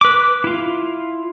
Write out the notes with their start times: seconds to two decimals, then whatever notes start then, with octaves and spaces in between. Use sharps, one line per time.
0.01 B4 D6
0.44 E4 F4